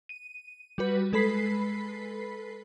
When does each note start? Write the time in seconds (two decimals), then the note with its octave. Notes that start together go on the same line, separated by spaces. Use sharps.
0.09 D#7
0.78 G3 F#4 B4
1.13 G#3 A4 B4 B5 B6 C7